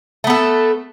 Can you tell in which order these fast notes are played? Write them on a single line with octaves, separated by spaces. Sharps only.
A3 B3 A4